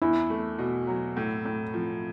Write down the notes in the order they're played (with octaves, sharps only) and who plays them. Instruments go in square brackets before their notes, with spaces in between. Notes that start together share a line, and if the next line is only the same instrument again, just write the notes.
[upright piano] E2 [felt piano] E4
[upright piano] A3
B2
F#3
A2
A2
F3